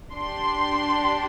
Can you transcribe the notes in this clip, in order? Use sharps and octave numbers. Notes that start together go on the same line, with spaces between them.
D4 G4 C6